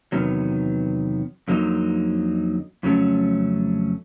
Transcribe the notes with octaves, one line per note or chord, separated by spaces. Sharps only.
E2 C3 D#3 F#3 B3
F2 D3 F#3 A#3 D#4
F2 C#3 F#3 A3 C#4